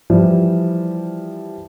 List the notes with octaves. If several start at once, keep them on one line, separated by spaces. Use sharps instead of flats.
E3 F3 G3 E4